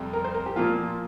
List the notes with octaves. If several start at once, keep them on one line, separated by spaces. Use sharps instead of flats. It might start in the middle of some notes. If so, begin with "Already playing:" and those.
Already playing: F2 C3 G3
A#4
C5
A#4
G4
A#2 F3 A#3 F4